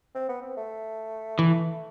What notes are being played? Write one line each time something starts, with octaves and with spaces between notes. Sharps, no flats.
C4
B3
C4
A3
E3